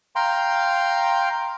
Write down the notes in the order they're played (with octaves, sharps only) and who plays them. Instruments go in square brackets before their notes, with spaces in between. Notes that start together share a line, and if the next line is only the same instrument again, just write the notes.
[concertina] F5 G5 A#5 C6